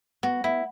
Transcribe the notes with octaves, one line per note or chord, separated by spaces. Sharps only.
B3 F#4
B3 E4